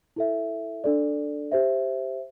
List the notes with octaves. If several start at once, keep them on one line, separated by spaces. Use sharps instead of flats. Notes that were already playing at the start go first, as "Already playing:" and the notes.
E4 A4 E5
D4 A4 D5
G4 C5 E5